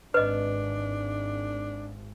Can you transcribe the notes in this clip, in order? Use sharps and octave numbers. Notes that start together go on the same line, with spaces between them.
G#1 D4 B4 D#5